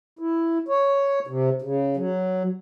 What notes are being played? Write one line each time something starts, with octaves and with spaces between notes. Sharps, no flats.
E4
C#5
C3
C#3
F#3